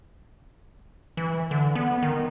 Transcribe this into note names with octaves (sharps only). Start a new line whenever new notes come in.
E3
D3
B3
D#3